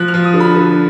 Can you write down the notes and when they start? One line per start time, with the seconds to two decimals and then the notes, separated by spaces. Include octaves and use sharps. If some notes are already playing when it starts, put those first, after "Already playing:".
Already playing: F3 F#6
0.08 F6
0.14 F3
0.24 D#6
0.34 D3
0.40 B5
0.56 D3